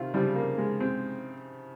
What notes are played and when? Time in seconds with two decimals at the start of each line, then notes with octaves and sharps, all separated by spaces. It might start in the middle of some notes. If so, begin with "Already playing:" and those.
Already playing: C3 D#3 F4
0.14 C#3 F3 G3
0.36 A#3
0.58 G#3
0.80 C4